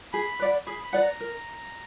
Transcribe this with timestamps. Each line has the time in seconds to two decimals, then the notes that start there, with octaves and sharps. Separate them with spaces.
0.13 G#4 B5
0.39 B4 D5 F#5
0.67 G#4 B5
0.84 B5
0.93 B4 D5 F#5
1.02 A#5
1.20 A#4